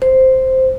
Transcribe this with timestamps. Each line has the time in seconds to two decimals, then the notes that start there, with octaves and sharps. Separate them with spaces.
0.02 C5